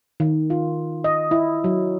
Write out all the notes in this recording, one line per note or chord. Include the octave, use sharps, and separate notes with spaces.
D#3
F4
D#5
E4
F#3